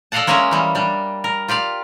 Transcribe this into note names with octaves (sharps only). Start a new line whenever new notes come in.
A4 D5 D#5 F5 F#5 A5
G#3 A#3 C#4 A#4 E5 G#5
E3 G3 A#3
G3 D4
A#4
F4 G4 D5 F5